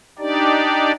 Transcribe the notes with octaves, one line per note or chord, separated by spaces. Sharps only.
D4 D#4 G4 D5